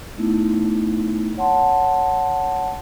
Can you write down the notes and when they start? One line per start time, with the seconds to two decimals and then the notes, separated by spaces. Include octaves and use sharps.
0.18 A3 B3 D#4 E4
1.37 C#5 F#5 A5 C6